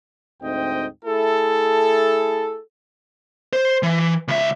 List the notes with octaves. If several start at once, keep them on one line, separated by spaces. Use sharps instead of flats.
D2 G#2 C4 D#4 D#5 G5
A3 E4 G#4 A4
C5
E3
C#2 E5